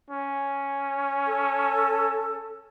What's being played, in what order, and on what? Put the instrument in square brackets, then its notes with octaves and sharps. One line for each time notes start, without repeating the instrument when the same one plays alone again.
[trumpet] C#4
[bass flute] A4